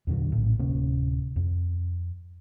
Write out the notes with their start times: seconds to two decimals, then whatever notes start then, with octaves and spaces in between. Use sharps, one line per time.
0.07 E2 A#2 D3 F#3
0.32 A#1 A2
0.59 D1 C3 A#3 C#4
1.36 F2